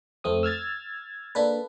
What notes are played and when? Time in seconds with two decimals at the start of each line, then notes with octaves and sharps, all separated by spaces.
0.24 F2 A3 C4 D#6
0.43 E6 F6 G#6 A6
1.35 A#3 D4 A4 B4